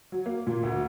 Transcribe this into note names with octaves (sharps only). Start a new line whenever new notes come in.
F#3
A#3
A#2
D2